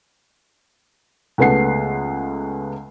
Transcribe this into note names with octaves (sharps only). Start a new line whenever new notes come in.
C#2 C#3 A3 B3 F#5 C7